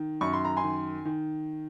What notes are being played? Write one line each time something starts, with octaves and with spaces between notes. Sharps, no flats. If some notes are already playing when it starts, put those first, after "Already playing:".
Already playing: D#3
F#2 C#6
C6
A#5
G#5 C6
D#3
D#3